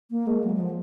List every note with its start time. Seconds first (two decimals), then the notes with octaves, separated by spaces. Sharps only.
0.10 A#3
0.27 G#3
0.44 F#3
0.55 F#3
0.60 F3